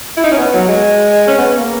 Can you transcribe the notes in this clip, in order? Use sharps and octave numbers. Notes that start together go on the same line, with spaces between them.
E4
D#4
C#4
B3
F#3
G#3
C#4
B3
A#3